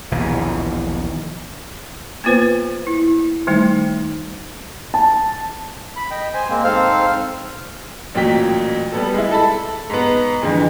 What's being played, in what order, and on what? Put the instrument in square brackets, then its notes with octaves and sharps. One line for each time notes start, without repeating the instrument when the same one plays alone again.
[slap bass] A#1 D#2 B2 E3
[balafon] A#3 B3 F4 B4 C5
E4
D#3 G3 A3 D#4
[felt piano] A5
[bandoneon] B5
D#5 G5
C5 G#5
G#3 A#3 C4
G#2 C4 A4 C5 F5 F6
[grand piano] A1 A#2 F#3 G5 B6
G3 B3 A4
G#3 E4
A4 A5 B5
G#2 B3
F2 G#2 D3 E3 G#3